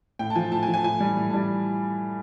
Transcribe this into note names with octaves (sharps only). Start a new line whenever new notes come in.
A2 G5
A5
F3 G#5
A2 A5
G#5
F3
G#5
A2 G#5
E3 G3
A2
E3 G3 A5